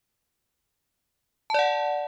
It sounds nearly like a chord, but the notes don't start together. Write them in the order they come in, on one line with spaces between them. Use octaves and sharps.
A5 D5 F#5